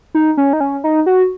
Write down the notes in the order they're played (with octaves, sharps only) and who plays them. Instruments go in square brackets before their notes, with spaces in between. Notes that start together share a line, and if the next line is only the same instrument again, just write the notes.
[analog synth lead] D#4
C#4
D#4
C#4
D#4
F#4